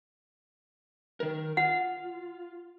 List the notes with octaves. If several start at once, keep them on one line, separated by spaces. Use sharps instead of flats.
D#3 A#4
F4 F#5